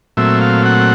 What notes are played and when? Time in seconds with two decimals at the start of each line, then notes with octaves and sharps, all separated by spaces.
0.17 A#2 F#3 A3 C4 E5
0.41 F5
0.65 F#5